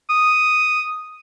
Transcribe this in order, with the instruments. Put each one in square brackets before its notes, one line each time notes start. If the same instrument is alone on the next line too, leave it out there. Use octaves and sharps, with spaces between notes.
[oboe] D#6